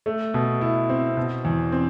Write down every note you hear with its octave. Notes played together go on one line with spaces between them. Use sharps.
A3
B2
E4
C4
B2
E2
C4